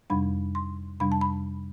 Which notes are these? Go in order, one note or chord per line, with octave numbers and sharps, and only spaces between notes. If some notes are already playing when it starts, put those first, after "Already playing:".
F2 C3 G3 D4 B5
C6
F2 C3 G3 D4 B5
A5
B5